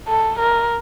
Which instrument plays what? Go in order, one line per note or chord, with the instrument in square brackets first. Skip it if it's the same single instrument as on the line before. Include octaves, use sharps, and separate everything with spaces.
[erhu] A4
A#4